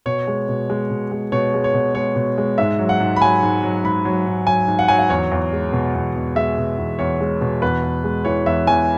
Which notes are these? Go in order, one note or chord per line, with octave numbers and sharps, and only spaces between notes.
B2 C#5
G#3
B2
G#3
B2
G#3
B2 C#5
G#3
C#5
B2
G#3 C#5
B2
G#3
G#2 E5
F#3
F#5
G#2
B5
F#3 G#5
G#2
F#3
G#2 B5
F#3
G#2
F#3 G#5
G#2
F#5
F#3 G#5
F#5
E2 C#5
E2
G#3
B2
E2
E2
G#3 E5
B2
E2
E2 C#5
G#3
B2
E2 B4
E2
G#3
E3 C#5
E2 E5
E2 G#5